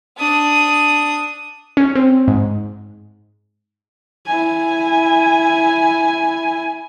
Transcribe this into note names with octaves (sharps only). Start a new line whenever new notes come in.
D4 D#6
C#4
C4
G#2
E4 G#5